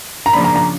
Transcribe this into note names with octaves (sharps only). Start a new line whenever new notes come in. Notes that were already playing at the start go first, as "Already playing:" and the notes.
A#5
C#3 F3 A#3 D4 B5
A#5
A#5